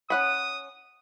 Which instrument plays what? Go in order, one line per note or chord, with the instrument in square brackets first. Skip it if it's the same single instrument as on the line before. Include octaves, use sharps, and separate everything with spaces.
[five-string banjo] C#4 F#5 B5 [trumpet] D#6